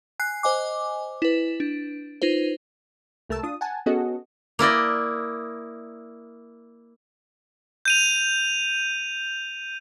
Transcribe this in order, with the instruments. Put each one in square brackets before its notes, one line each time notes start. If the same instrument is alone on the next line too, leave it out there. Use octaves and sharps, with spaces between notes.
[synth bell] G#5 F#6 C7
C5 D#5 G#5 D6
E4 B4
D4
D#4 F4 B4 C5
[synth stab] C2 A3 A#4 A5 E6
D4 F4 D#6
F#5 G#5 A5
B3 C#4 F#4 G#4 A4 D#5
[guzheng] A#3 E4 D5 D#5
[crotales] G6 D#7 F7